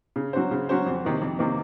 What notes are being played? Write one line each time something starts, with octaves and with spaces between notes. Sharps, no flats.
C#3
F#3 C#4 F#4 C5
C#3
F#3 C#4 F#4 C5
F2
C3 D#3 A#3
F2
C3 D#3 A#3